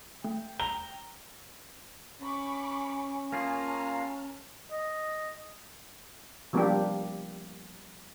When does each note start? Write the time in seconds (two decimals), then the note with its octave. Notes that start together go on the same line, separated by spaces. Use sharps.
0.24 A3 G5
0.60 A#5 G7
2.22 C#4 B5 C#6 D6
3.32 A#3 F4 G#4 A5 A#5 F6
4.71 D#5
6.53 F3 G3 A#3 B3 D4 G4